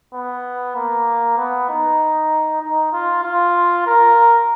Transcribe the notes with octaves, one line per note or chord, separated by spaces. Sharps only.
B3
A#3
B3
D#4
D#4
F4
F4
A#4